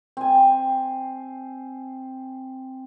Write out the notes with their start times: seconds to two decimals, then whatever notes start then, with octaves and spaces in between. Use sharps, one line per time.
0.17 C4 G#5